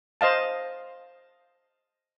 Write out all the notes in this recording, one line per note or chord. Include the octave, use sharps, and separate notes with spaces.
C5 D#5 F5 A5